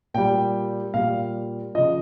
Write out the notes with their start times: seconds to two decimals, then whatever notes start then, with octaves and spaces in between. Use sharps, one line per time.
0.14 A#2 G3 G5
0.94 A#2 G3 F5
1.75 C#3 F3 D#5